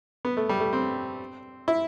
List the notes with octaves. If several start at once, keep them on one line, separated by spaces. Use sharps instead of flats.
B3
A3
G3
A3
C4
E4